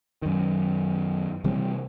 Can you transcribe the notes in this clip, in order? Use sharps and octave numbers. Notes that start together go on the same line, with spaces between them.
F#2 D#3
C3 E3 G3 C4